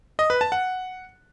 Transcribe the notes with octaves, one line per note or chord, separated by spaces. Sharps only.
D#5
B4
A5
F#5